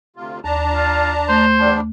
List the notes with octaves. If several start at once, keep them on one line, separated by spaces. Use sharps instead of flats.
D2 C3 F4
D#2 D4 A5 A#5
F4
A3 C5
E2 G3 D4